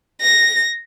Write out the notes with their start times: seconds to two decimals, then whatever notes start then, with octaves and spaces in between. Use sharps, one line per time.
0.21 A#6